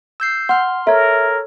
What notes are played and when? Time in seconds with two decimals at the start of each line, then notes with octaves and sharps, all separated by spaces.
0.20 E6 G6 C7
0.49 F#5 C6 F6
0.87 A4 A#4 C#5 E5